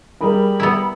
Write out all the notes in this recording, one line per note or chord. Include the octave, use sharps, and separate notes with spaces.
G3 G#4 A#4 B5
B3 E4